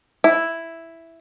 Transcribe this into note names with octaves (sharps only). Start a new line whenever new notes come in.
E4